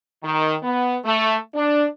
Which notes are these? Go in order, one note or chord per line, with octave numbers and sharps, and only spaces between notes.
D#3
B3
A3
D4